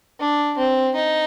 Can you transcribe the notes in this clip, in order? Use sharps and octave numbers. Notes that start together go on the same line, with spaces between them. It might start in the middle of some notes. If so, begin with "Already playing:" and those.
D4
C4
D#4